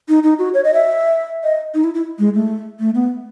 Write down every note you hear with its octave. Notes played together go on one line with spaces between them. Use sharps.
D#4
D#4
F#4
C#5
D#5
E5
D#5
D#4
E4
E4
G#3
A3
A3
B3